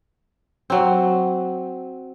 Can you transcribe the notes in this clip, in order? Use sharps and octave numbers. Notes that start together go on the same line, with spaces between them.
F#3 C4